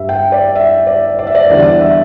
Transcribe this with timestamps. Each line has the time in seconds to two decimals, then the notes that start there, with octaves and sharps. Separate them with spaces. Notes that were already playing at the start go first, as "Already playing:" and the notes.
Already playing: G2 G3 E5
0.09 G5
0.32 D5
0.55 E5
0.87 D5
1.19 D5
1.27 E5
1.35 D5
1.50 E2 D3 G3 D5
1.81 E5